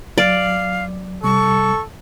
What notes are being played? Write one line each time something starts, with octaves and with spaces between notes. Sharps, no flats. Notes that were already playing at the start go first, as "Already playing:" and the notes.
F#3 D5 F5
C3 G3 A4 C#6